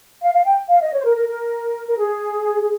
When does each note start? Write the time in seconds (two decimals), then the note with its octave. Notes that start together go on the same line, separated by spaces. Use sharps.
0.23 F5
0.34 F5
0.46 G5
0.69 F5
0.81 D#5
0.93 C#5
1.00 C5
1.05 A#4
1.16 A#4
1.28 A#4
1.88 A#4
1.98 G#4
2.61 G#4